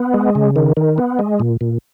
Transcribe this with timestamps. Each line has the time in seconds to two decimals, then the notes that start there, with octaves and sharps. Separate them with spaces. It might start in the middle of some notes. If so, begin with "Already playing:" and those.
Already playing: B3
0.14 G#3
0.35 C#3
0.56 D#3
0.77 D#3
0.98 B3
1.19 G#3
1.40 A#2
1.61 A#2